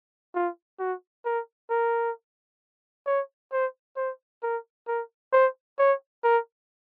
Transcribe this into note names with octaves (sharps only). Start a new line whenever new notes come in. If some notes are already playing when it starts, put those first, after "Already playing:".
F4
F#4
A#4
A#4
C#5
C5
C5
A#4
A#4
C5
C#5
A#4